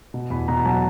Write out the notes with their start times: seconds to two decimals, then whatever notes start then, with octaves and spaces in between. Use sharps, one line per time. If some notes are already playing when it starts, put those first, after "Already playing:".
0.14 B2
0.30 E2 B5
0.48 B2 A#5
0.65 F#3 A5